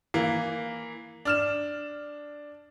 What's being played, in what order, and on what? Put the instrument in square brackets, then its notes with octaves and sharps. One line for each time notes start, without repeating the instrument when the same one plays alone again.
[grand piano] E3 A#3
D4 F6 E7